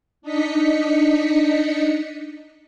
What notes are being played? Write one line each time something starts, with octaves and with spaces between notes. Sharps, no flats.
D4 D#4 D#5 B6 C#7